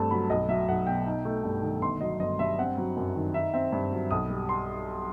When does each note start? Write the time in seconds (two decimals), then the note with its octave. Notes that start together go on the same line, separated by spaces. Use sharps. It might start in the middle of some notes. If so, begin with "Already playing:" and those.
Already playing: G2 A3 C4 A5
0.11 F#3 B5
0.30 B1 D#5
0.48 F#3 E5
0.68 B1 F#5
0.87 B2 G5
1.06 D#4
1.25 A3
1.44 G2
1.62 D#3
1.82 G1 C6
2.01 F#3 D#5
2.20 G1 D#5
2.39 G2 E5
2.59 C4 F#5
2.77 F#3
2.97 F#2
3.15 D#3
3.34 D#4 E5
3.54 C4 E5
3.72 G2
3.92 F#3
4.11 B1 D#6
4.30 G3
4.49 C6